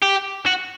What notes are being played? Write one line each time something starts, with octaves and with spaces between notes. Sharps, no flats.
G4
F#4